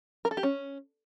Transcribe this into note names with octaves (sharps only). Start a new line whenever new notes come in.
A#4
A4
G4
C#4